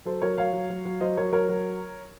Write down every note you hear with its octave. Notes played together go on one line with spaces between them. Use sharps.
F#3 A4 C5
F#3 A#4 C#5
F#3 C#5 F5
F#3
F#3
F#3
F#3 C5 D#5
F#3 A#4 C#5
F#3 A#4 C#5
F#3